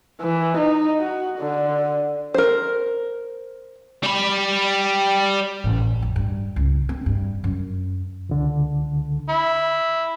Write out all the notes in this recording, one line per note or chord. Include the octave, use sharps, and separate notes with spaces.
E3
D#4
F#4
D3
A#4 C5
G3 B5
A1
F2
G2
C#2
C4
G2
F#2
C#2 D3
E4